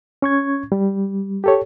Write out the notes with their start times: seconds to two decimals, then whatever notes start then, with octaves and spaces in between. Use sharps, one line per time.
0.22 C#4 C#6 G#6
0.72 G3
1.44 G4 A4 C#5